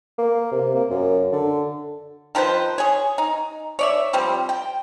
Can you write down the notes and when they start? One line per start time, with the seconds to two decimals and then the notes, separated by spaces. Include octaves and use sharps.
0.18 A#3
0.52 C3
0.74 A#3
0.90 F#2
1.32 D3
2.35 D#3 F3 B4 C5
2.78 G#4 C#5
3.18 D#4
3.79 C#5 D5 E5
4.13 F3 G3 C4
4.49 G5